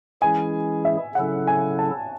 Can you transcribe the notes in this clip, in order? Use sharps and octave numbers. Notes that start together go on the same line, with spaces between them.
E3 G#3 C#4 E4 G#4 G#5
E5
C#3 F#3 C#4 E4 A4 F#5
G#5
A5